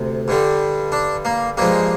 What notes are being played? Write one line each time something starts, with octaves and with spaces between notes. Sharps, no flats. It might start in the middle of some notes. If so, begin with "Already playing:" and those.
Already playing: D2 C3
G2 D3 G3
D4
A#3
G2 F3 G#3 A#3